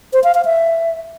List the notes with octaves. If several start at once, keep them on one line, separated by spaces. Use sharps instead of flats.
C5
F5
F5
E5